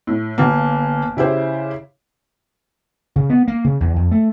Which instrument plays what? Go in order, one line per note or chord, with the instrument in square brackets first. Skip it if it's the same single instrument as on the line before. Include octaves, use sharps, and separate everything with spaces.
[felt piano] A2
G1 A#3
C#3 E4 G4 C5
[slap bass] C#3
B3
A#3
C#3
E2
F2
A3